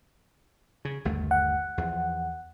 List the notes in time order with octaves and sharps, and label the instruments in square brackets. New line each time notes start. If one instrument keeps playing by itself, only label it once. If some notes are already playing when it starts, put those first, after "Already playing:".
[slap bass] C#3
G1 D#2 A3
[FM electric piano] F#5
[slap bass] E2 F3